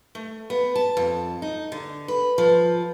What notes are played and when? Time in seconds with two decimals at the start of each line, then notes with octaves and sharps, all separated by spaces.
0.15 A3
0.50 B3
0.76 A5
0.97 F2
1.42 D#4
1.72 D3
2.08 B4
2.38 F3